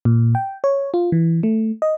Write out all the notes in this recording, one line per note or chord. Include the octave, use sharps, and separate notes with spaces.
A#2
G5
C#5
F4
E3
A3
D#5